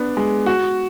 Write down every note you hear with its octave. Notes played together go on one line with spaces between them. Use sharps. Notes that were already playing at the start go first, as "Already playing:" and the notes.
Already playing: B3 D4
G#3
F#4